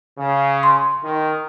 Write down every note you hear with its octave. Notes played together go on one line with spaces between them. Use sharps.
C#3
C6
D#3